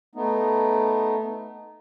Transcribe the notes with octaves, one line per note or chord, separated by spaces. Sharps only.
A3 B3 D#4